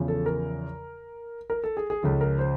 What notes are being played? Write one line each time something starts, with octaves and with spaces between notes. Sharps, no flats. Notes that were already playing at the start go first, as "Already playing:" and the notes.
Already playing: E2 C#3 F3
A4
A#4
A#4
A4
G#4
G#4
C#2 C#3 F3 A4
A#4
C5